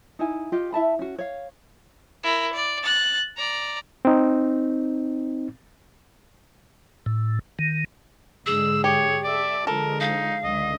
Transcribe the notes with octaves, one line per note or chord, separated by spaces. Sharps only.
D#4 E4 G#5
F4 G4 D#5
E4 E5 A5 B5
C#4 F#4
C#5 F5
E4 A#4
D5
F#6 A6
D5 A#5
C4 D#4
A2
D#3
G#2 D3 G#4 E6
G4 C#5
A4 D5 E5
D3 F3 G#3 A4 A#4
D#4 F5
C#2 D3 D#5